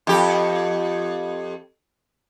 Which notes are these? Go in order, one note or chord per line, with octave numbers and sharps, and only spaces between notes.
F2 G4